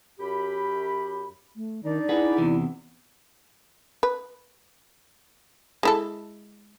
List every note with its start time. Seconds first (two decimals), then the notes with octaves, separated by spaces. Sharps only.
0.20 F#2 G4 B5
1.56 A3
1.83 D#3 D4 D#4 D5
2.09 E4 G#4 B4 F#5
2.38 E2 C3 E3
4.03 B4
5.83 G#3 E4 A4